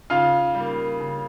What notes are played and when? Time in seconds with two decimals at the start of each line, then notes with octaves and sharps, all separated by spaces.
0.10 C#3 F4 F5
0.55 G3
0.60 A#3
1.00 C#3